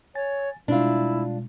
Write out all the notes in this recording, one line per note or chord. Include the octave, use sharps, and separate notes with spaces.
C#5 G#5 A6
B2 G3 G#3 D4 E4 F4